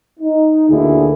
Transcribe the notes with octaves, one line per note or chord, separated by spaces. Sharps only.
D#4
D2 A#2 D3 E4 G#4